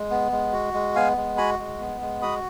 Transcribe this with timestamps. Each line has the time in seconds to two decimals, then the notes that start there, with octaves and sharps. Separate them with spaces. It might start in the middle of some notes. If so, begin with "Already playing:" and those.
Already playing: G#3
0.11 B3
0.32 G#3
0.53 F#4
0.74 G#3
0.95 B3 F5 G#5
1.17 G#3
1.38 F#4 G#5 B5
1.59 G#3
1.80 B3
2.01 G#3
2.22 F#4 B5 D#6